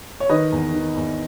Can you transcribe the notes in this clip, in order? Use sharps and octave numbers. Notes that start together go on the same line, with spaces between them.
C#5
D#3 B4 D#5
E2
D#3
E2